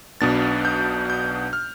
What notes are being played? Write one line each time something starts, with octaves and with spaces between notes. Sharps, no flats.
B1 B2 B3 D4 A6
G6
G6
F6